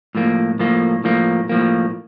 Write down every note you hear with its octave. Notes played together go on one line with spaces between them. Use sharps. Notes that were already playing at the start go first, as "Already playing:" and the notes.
A2 F3 A#3
A2 F3 A#3
A2 F3 A#3
A2 F3 A#3